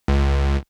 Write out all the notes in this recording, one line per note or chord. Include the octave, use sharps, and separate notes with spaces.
C#2